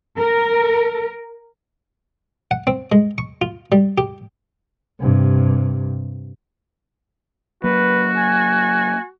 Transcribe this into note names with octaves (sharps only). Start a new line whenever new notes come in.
A#4
F#5
C4
G#3
C#6
F4
G3
G4
G2 C3
F#3 A#3 F#4 B4
G#5